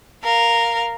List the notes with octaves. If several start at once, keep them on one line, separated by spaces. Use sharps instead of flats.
A#4 F5